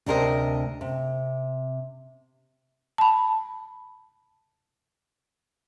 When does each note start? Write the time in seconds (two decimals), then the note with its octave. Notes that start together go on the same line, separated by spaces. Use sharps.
0.06 D2 C3 D4 A#4 C5 D#5
0.81 C3
2.98 A5 B5